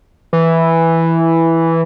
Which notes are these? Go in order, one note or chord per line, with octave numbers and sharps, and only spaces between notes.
E3